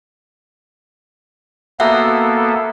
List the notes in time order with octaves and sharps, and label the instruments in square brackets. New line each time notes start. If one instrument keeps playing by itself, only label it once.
[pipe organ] A#3 B3 A4 [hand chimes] F#4 E5 F#5